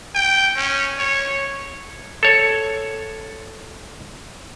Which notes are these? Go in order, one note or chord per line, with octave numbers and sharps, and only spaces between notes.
G5
C#4
C#5
A4 C#5